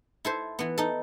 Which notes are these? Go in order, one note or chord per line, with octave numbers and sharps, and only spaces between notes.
E4 A4 C5
E3 B3
D#4 A4